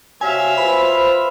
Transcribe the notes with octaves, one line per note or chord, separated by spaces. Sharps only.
C3 F#4 C#5 E5 F5 G#5
F4 B4 C5 B5